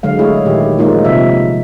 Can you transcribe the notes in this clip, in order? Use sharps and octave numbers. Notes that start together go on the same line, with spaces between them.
D3 F#3 G#3 F5
A3 E4 G#4 C#5
A#2 D#3 G4
F3 G#3 A#3 D#4 F4
C3 F3 E5